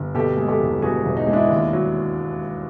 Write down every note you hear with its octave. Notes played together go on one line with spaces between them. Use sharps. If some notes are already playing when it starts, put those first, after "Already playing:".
Already playing: G1
B2 G4 A4
G#3
G4 A4
E1
E1 F#4 G#4
E1
D#4
G#3
D4 E4
D#2
F#3